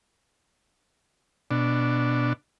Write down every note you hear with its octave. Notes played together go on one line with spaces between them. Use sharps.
B2 D4